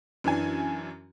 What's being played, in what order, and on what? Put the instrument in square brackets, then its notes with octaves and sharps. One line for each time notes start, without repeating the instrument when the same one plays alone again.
[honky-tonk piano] F#2 E3 D4 G#5